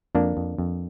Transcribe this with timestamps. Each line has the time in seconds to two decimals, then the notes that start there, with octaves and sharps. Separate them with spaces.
0.15 F2 A#3 D4
0.37 F2
0.58 F2